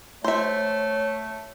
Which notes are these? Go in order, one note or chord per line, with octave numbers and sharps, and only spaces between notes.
A3 C5 C#5 E5